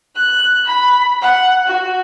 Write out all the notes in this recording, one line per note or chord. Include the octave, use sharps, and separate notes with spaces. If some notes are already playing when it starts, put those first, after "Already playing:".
F#6
B5
F#5
F#4